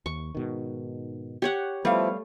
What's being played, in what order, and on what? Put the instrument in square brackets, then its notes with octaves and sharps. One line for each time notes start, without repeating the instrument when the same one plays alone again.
[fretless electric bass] D#2 [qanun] C#6
[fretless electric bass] G#2 B2 D#3
[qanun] G4 C#5 F#5
[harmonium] F3 E4 [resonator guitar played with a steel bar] G3 F5 [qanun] A3 [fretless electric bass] B3